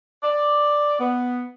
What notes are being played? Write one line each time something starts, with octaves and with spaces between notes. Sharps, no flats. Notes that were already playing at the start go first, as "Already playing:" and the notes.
D5
B3